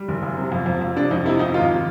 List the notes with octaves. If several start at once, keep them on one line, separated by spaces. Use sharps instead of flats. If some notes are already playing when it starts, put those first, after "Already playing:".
Already playing: G3
F#1
F#2
C3
F2
F2
F2
C3 D4
F2 D#4
C3 E4
F2 D#4
G#1 F4